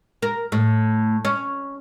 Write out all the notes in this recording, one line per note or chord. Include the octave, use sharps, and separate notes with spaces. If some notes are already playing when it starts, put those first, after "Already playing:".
A#4
A2
C#4